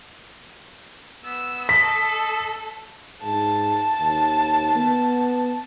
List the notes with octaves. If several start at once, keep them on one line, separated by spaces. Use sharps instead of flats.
B3 E6
A4 D#5 B6
G#2 A5
D#2
B3